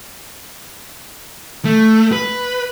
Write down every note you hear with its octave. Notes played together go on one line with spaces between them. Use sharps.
A3
B4